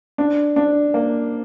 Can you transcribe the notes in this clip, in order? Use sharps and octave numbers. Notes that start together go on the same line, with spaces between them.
D4
D4
A#3